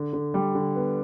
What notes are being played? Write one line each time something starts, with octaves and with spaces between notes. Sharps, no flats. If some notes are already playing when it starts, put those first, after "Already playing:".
Already playing: D3
D3
G3
D3
B3